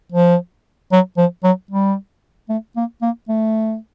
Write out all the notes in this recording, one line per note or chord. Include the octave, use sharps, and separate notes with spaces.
F3
F#3
F3
F#3
G3
A3
A#3
A#3
A3